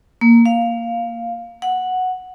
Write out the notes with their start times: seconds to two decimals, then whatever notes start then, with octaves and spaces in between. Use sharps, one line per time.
0.21 A#3
0.46 F5
1.62 F#5